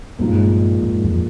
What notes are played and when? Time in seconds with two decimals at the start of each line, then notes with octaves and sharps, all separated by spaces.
0.19 G2 A#2 F3 G#3 D#4
0.82 G#2
1.03 F2